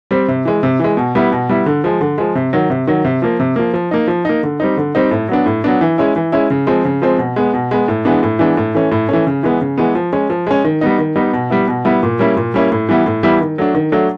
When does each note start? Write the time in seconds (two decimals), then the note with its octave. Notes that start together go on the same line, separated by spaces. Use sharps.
0.11 G3 C4
0.28 C3
0.45 E3 G#3
0.63 C3
0.79 E3 G#3
0.97 B2
1.15 G3 B3 E4
1.32 B2
1.49 G3 B3 E4
1.66 D3
1.84 F3 G#3
2.01 D3
2.18 F3 G#3
2.35 C3
2.53 D#3 F#3
2.70 C3
2.87 D#3 F#3
3.05 C3
3.22 F3 A#3
3.40 C3
3.56 F3 A#3
3.74 F3
3.91 A#3 D#4
4.07 F3
4.25 A#3 D#4
4.43 D3
4.60 G3 C4 D#4
4.77 D3
4.95 G3 C4 D#4
5.11 A2
5.28 F#3 B3 D4
5.46 A2
5.64 F#3 B3 D4
5.81 E3
5.98 G#3 C#4 E4
6.16 E3
6.32 G#3 C#4 E4
6.50 C#3
6.67 F3 G#3 C4
6.85 C#3
7.02 F3 G#3 C4
7.18 B2
7.36 G#3 B3
7.54 B2
7.71 G#3 B3
7.88 A2
8.05 E3 G#3 B3 D4
8.23 A2
8.39 E3 G#3 B3 D4
8.57 A2
8.75 E3 A3 C#4
8.91 A2
9.09 E3 A3 C#4
9.27 C#3
9.43 E3 G#3 B3
9.61 C#3
9.78 E3 G#3 B3
9.95 F3
10.13 G#3 C#4
10.30 F3
10.47 G#3 C#4
10.64 D#3
10.81 G3 B3 D#4
10.98 D#3
11.16 G3 B3 D#4
11.33 B2
11.50 G3 B3 E4
11.68 B2
11.85 G3 B3 E4
12.03 A#2
12.19 G3 A#3 C#4 E4
12.36 A#2
12.54 G3 A#3 C#4 E4
12.72 A2
12.89 E3 G3 B3 E4
13.06 A2
13.23 E3 G3 B3 E4
13.41 D#3
13.58 F#3 A3 D4
13.75 D#3
13.92 F#3 A3 D4